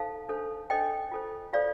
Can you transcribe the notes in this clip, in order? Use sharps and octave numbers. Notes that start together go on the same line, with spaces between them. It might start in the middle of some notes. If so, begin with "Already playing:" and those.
Already playing: D#4 A4 C5 F5 A5
D4 A4 C5
D4 A4 C5 D#5 G5
F4 A4 C5
F4 A4 C5 D5 F5